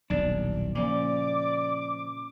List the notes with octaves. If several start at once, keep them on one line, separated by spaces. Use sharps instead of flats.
D#1 B1 D4
A#2 C#3 F3 D5 D6